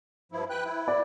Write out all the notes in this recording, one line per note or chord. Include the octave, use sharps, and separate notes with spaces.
G2 F3 E4
B4 G5 F#6
E4
D5